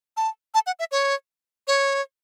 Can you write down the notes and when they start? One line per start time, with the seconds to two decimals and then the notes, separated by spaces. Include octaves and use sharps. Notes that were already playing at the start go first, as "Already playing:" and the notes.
0.17 A5
0.54 A5
0.67 F#5
0.79 E5
0.92 C#5
1.68 C#5